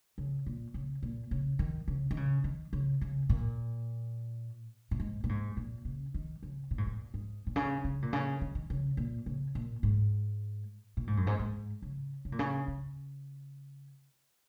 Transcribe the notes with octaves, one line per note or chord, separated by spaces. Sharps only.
C#3
A#2
C#3
A#2
C#3
D#3
C#3
D#3
C#3
D#3
C#3
C#3
A#2
A#2
G#2
A#2
G#2
A#2
C#3
D#3
C#3
A#2
G#2
A#2
G#2
A#2
C#3
C#3
A#2
C#3
D#3
D#3
C#3
A#2
C#3
A#2
G#2
A#2
G#2
F#2
G#2
G#2
C#3
C#3
A#2
C#3
C#3